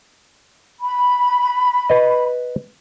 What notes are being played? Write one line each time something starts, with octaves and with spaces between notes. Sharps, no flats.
B5
B4 D#5